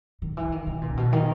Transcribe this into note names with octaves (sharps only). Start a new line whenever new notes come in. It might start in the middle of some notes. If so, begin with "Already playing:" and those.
D#3
E3
D#3
C#3
A#2
B2
D#3